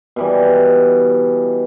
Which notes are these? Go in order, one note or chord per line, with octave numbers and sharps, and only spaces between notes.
B2 E3 G3